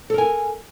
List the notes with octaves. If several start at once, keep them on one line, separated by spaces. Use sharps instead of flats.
A4 A#4 G#5